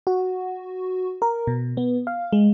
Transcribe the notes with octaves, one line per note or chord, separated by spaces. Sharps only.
F#4
A#4
B2
B3
F5
G#3